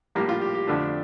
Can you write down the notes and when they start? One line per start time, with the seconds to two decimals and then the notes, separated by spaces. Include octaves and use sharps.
0.15 A#1 A2 G3 A#3 G4
0.29 F4
0.42 G4
0.54 G4
0.67 F2 D3 A3 D4